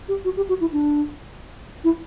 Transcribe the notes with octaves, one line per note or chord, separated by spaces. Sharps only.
G4
F#4
G4
F#4
E4
D4
E4